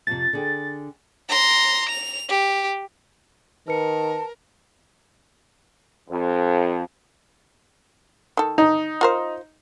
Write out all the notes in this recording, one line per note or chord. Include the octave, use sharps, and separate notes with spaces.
F2 C3 A6
D3 G#4 G5
A#5 C6
F7
G4
D#3 A#4 B4 A5 C#7
F2
D#3 A4
D#4
F4 A#4 C5